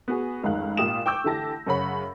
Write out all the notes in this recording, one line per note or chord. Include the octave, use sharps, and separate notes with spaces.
B3 F#4 G#4
F1 C#2 G#2 D#3 F5 F#6
G#1 A#2 F4 G4 D#6 E7
G5 C#6 D6 E6 G6
D3 E3 G4 A5 A#6
F#2 C#3 C#4 F#5 B5